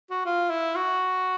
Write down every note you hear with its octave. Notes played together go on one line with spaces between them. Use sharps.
F#4
F4
E4
F#4